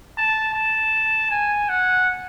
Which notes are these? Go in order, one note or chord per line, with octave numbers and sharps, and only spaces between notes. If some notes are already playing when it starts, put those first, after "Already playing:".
A5
A5
G#5
F#5